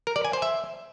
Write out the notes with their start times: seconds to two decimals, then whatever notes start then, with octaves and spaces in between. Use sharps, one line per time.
0.07 A#4
0.16 D5
0.25 G#5
0.33 C5
0.42 E5